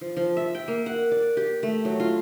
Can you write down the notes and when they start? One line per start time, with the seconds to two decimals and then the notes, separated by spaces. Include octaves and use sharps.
0.01 F3
0.17 F3
0.37 E5
0.55 G5
0.68 A#3
0.86 F#5
1.12 D5
1.37 G4
1.63 A3
1.85 F#3
2.00 F4